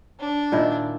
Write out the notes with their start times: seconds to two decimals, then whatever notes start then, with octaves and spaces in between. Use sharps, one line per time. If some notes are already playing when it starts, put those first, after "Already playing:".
0.20 D4
0.52 A#2 D#3 E4